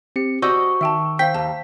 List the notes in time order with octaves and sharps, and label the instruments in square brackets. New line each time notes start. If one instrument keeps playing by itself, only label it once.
[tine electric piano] C4 C#7 [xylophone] G4
[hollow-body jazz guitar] F#4 D5 D#5 [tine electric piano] C5 [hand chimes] C#6 [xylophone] E6 G6
[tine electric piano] D#3 E6 [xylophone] E5 G5 A5
[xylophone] C5 F5 [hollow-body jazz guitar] G5 [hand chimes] B6
[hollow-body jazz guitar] D#2 [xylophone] F5 A5